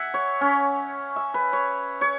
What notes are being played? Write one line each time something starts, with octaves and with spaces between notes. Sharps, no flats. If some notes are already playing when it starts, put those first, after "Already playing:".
Already playing: E5 F#5 G#5
C#5
C#4
E5
B4
C#5
C#5